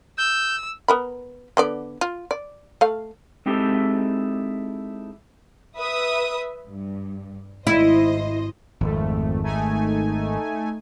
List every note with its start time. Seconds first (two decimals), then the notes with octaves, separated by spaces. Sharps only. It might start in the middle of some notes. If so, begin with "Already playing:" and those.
0.18 E6 G6
0.88 B3 A#4 B5
1.57 D3 B3 D5
2.01 F4
2.31 D5
2.81 A3 F5
3.46 G#3 C4 D#4 E4 G4 A4
5.78 B4 E5 D#6
6.68 G2
7.67 G#1 E4 C5 D#5
8.81 G#1 F2 A3
9.44 A3 D#4 G#5